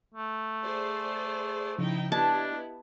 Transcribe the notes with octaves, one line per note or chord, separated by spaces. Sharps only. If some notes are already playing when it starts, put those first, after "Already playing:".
A3
G#4 C5 D5
C#3 F3 D#4 E4 G5
B3 D4 E4 G4 D#5 A5 G#6